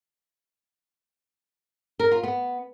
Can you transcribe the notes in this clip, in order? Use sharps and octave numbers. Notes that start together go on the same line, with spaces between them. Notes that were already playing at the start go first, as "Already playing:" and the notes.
A#4
F4
B3